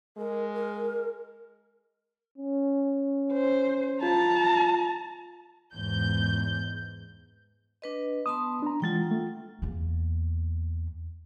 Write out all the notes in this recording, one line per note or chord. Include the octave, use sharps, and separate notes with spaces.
G#3 A#4
A#4
C#4
C5
F4 A5 A#5
E2 G#2 G6
D4 B4 D#5
B3 A5 C6 D#6
D4 A#5
E3 G#3 F4 F#5 G5 A6
A3
E2 A#3